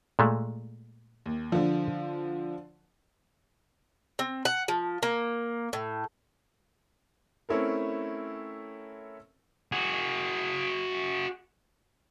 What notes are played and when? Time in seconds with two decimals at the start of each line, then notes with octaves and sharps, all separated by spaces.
0.19 A#2 G#3 A3
1.26 D#2
1.52 D3 F3
4.19 C4
4.45 F#5
4.68 F3
5.03 A#3
5.73 A2
7.49 A3 C4 C#4 E4 A4 A#4
9.72 F#4 G#4